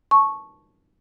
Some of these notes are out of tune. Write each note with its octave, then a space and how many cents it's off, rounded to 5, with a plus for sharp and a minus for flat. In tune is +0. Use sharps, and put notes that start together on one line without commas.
A5 -10 C#6 -10